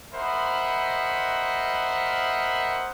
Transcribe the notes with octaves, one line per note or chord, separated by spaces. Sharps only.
A#4 C5 D#5 E5 F#5 B5